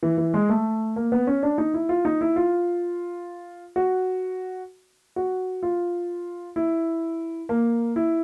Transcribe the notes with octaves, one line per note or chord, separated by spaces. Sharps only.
E3
E3
G#3
A3
A#3
B3
C#4
D4
D#4
E4
F4
D#4
E4
F4
F#4
F#4
F4
E4
A#3
E4